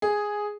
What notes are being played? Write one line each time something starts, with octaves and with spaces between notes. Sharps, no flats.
G#4